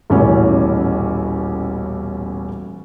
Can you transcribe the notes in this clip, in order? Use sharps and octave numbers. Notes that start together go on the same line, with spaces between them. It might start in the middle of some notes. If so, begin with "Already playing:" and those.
D#1 A1 B2 C#4 E4